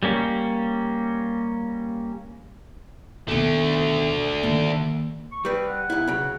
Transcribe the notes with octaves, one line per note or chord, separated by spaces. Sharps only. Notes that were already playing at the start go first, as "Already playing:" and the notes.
G3 A#3 C#4
B2 D3 D#3 A3
D#3 A#3
C#6
G3 C4 B4
F#5
B1 E4
C#3 F#3